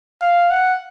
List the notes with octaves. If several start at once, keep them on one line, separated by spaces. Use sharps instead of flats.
F5
F#5